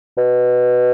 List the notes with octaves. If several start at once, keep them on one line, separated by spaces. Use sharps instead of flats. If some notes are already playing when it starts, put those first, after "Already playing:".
B2